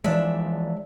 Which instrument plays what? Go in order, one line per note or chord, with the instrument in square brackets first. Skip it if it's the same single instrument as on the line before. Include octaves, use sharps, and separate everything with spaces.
[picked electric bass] E3 F3 G#3 [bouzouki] D4 E5